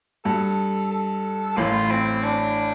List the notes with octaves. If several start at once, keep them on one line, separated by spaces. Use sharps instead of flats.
G2 A4
A4
A1 A2 F4
C4
D4